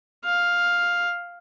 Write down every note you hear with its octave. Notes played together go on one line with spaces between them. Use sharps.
F5